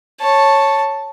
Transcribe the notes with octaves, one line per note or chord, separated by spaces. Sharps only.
C#5 A5